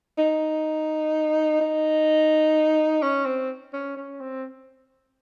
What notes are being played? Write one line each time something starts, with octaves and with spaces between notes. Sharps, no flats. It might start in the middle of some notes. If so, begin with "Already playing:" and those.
D#4
D#4
C#4
C4
C#4
C#4
C4